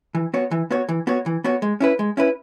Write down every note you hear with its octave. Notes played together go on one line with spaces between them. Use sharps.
E3
B3 F#4 C#5
E3
B3 F#4 C#5
E3
B3 F#4 C#5
E3
B3 F#4 C#5
G#3
C#4 E4 B4
G#3
C#4 E4 B4